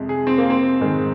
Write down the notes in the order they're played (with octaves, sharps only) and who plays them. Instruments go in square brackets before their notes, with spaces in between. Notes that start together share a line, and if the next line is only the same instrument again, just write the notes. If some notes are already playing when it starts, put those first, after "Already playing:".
Already playing: [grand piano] F2 C3 G#3
G#4
C4
A#3
C4
G#2 D#3 G#3